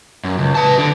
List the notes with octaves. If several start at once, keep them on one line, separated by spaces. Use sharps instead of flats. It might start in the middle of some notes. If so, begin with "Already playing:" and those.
F#2
C#2
B4 A5
D3